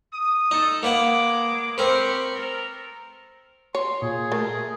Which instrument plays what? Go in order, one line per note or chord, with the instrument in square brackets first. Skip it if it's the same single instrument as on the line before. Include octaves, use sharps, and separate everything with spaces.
[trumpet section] D#6
[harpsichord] D#4 [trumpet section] A4
[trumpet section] G#3 D6 [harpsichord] A#3 B4 F#5
[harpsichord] C4 A#4 B4 [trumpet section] G4 F5 C#6
[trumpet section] A4 A#4
[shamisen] C#5 [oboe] C6
[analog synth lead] A#2 [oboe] G#4
[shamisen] A3 [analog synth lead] A#4